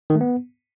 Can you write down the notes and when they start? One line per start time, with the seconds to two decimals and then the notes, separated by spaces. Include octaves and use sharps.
0.10 D#3
0.15 A3
0.21 B3